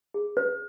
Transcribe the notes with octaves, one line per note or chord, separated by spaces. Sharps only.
G#4
B4